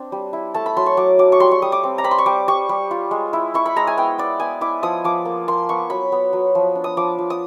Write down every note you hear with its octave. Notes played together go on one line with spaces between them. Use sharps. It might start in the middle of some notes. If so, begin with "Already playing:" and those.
Already playing: C4 D4
G3
E4
A3 A5
B5
F#3 C6
C#6
F#3 D6
F#3 D6
C#6
G3 C6
C#6
G3 D#6
D6
C4
A#5
C4 B5
C6
C#6
G3 D6
G3 C#6
G3
F4
G#3
E4
E4 C#6
B5
G#3 A#5
G#5
B3 G5
B3 D5
B3 G#5
E4 D6
F3 D#6
F3 D6
A#3
A#3 C6
B3 C#6
F#3 B5
B3
F#3
F3
D4
D#6
F3 D6
F3
D#6